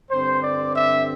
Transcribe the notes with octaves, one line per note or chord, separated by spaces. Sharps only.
G2 D3 C4 C5
D5
E5